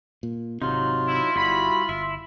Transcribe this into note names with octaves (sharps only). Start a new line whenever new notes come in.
A#2
G#1 C3 F#3 D#4 F4
E4
G1 G3 E4 F#4 B5
G1 E4 E5